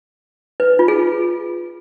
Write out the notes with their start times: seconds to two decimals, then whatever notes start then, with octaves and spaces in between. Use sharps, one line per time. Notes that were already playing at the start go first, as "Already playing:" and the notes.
0.60 B4
0.79 F4
0.88 G#4